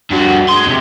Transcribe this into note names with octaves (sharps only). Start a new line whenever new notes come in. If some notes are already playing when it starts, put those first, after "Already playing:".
G2 F#4
G#4 C6
E2 C3